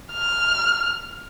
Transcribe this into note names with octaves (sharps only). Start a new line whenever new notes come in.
F6